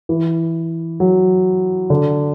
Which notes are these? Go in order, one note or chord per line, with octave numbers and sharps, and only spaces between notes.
E3
F#3
D3